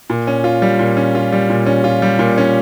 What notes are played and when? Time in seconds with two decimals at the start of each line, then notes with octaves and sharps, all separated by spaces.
0.10 A#2
0.27 C#4
0.44 F4
0.62 G3
0.79 A#2
0.97 C#4
1.15 F4
1.32 G3
1.50 A#2
1.66 C#4
1.84 F4
2.02 G3
2.19 A#2
2.38 C#4